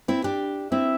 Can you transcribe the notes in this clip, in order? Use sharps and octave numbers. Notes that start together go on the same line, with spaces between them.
C4 E4
D4 G4
C4 E4 E5